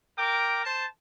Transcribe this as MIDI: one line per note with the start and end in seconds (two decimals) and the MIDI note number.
0.18 0.60 70
0.18 0.60 79
0.18 0.60 86
0.64 0.85 72
0.64 0.85 81